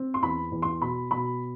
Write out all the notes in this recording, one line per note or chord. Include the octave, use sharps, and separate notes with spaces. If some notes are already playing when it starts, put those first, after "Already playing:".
Already playing: C4
C6
E2 B5
E2
C6
B2 B5
B2 B5